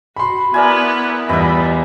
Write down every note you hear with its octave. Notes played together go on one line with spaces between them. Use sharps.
F#4 B5 C6
B3 E4 A#4 B4 D5 G#5
E2 G3 F4 D#5 E5 B5